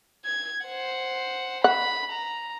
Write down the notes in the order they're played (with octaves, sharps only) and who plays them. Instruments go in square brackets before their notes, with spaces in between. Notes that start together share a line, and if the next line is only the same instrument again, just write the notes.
[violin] G#6
C5 F#5
[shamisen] F#5 [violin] B5
[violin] A#5